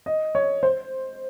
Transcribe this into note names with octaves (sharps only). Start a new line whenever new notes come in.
D#5
C#5
C5